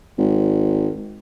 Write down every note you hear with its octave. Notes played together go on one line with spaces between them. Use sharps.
G#1